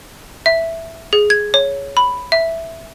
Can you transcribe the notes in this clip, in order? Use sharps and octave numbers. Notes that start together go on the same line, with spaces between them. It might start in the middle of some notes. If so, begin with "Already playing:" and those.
E5
G#4
G#6
C#5
B5
E5